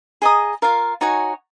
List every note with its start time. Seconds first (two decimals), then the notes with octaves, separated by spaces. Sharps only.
0.22 G#4 D#5 A#5 D#6
0.62 F4 A#4 F5
1.01 D#4 F#4 C#5 G#5